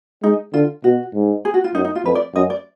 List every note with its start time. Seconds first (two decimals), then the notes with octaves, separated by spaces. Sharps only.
0.23 G#3 D#4
0.53 D3 F4
0.84 B2 F#4
1.14 G#2
1.45 G#4
1.54 F#4
1.64 F4
1.74 F#2 D#4
1.84 D#4
1.95 F4
2.05 F2 B4
2.15 D5
2.35 F#2 D#5
2.50 D5